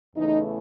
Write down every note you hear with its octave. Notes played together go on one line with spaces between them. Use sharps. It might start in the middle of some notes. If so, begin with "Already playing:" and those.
E2 C#3 E3 A3 D#4